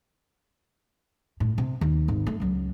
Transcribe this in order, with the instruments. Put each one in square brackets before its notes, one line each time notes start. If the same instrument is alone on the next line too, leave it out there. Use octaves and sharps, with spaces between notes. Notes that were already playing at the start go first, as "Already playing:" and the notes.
[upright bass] A2
C3
D#2
G#1
A3
C#2 F#3